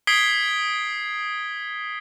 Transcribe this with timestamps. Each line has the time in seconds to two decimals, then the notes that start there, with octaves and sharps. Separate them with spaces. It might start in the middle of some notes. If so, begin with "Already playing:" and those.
0.07 D#6 G#6 B6 C7 D7 G7